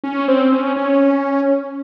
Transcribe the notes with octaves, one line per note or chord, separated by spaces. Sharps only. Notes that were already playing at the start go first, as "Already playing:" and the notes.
C#4
C4
C#4
C#4